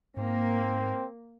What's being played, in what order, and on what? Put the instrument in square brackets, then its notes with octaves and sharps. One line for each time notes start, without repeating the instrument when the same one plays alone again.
[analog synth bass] G#2 [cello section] A#3 [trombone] C4